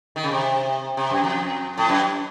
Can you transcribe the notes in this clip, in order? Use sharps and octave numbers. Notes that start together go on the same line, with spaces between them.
D#3
C#3
C3
C3
F#2
F2
A2
F#2